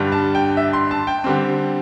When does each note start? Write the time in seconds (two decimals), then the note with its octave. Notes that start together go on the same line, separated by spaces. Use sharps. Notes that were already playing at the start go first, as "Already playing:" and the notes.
Already playing: G2 D3 G3 D4
0.12 A5
0.35 G5
0.57 E5
0.73 C6
0.91 A5
1.07 G5
1.24 D3 G3 C4